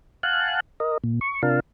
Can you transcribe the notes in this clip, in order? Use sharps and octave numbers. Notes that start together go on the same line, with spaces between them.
F5 F#5 G#5 A5 F#6
A#4 D#5
A#2
C#6
C3 D4 F4 A#4 F5 A5